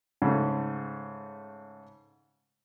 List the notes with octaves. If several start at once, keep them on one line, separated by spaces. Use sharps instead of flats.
G#2 C#3 A3